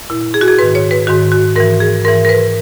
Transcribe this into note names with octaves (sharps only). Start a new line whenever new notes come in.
A#2 E4
G#4
F#4
G#4
G#2 D#3 B4
C#5
B4
G#2 D#3 F#4
F#4
G#2 E3 A#4
G#4
G#2 E3 A#4
A#4
B4